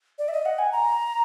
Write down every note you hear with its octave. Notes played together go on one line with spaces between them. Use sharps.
D5
E5
D#5
F#5
G#5
A#5